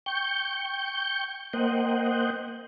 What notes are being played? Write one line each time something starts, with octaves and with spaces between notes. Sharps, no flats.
G5 C#6 G6
A#3 C5 D#5 F#5 G5